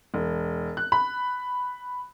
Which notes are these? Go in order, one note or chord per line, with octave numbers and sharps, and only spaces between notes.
E1
F#6
B5